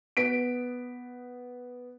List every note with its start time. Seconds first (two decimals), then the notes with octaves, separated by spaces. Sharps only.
0.17 B3 B6 D7